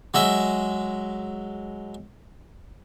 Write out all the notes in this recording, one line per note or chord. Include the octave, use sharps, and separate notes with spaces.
F#3 G#3 E5